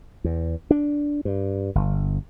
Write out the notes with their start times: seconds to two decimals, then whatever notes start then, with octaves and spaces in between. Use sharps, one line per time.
0.24 E2
0.71 D4
1.25 G2
1.75 G1